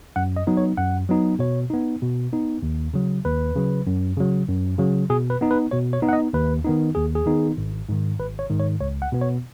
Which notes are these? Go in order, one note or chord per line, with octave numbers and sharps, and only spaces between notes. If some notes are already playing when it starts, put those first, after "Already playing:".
F#2 F#5
D#5
F#3 B3 D#4
C#5
F#2 F#5
F#3 B3 D#4
B2 C#5
B3 D#4
B2
B3 D#4
D#2
C#3 F#3
D#2 B4
C#3 F#3
F#2
C#3 F#3
F#2
C#3 F#3
B2 G#4
B4
B3 D#4
B4
B2 C#5
C#5
B3 D#4
F#5
D#5
D#2 B4
D#3 B3 D#4
D#2 G#4
G#4
D#3 B3 D#4
G#1
G#2 D#3
G#1 B4
C#5
G#2 D#3
C#5
C#2 C#5
F#5
B2 B3
C#5